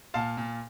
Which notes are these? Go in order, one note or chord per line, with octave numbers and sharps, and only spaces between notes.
A#2 F5 A5
A#2